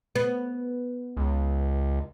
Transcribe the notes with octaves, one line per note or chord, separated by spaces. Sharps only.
B3
C#2